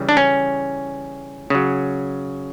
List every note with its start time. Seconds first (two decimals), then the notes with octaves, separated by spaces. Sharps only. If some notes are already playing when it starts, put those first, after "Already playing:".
Already playing: C#3 E3 G3
0.09 D4
0.17 C#4
1.50 C#3 F#3